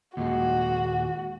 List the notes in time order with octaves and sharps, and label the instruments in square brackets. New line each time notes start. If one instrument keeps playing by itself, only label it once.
[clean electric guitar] D#2 A#2 G#3 [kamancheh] F#4